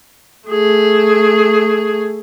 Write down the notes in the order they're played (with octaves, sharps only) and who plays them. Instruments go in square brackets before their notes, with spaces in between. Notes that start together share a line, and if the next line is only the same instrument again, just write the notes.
[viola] A3 G#4